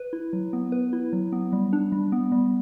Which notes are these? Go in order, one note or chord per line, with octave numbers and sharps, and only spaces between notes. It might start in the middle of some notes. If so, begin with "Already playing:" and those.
Already playing: B4
E4
F#3
B3
B4
E4
F#3
B3
G3
D4
G3
B3
G3